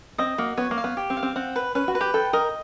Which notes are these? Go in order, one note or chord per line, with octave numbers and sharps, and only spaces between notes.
C4 D#5
A#3 F#4
B3 C#5
A#3
F5
B3
G4
C4
F5
C4
C4 F#5
B4
C#4 B4
F#4
B4
G4
A4 G5
A#4 D#5